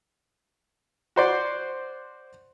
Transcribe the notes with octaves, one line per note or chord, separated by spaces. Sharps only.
F#4 C5 D5